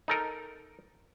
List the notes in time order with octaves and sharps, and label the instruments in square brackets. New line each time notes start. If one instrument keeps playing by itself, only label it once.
[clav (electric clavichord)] D#4 A4 A#4